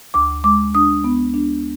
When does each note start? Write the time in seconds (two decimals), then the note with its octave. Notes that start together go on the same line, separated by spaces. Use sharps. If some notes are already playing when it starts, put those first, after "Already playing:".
0.14 D2 D6
0.44 G#3 D6
0.75 D4 D#6
1.04 B3
1.34 D4